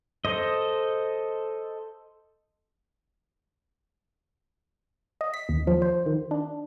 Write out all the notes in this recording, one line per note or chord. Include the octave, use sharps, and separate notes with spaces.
A4 C5 D#5
D#5
B6
D#2
F3
C5
D#3
D4